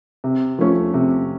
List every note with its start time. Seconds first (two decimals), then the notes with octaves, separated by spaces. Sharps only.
0.24 C3
0.59 F3 A3 C#4
0.94 C3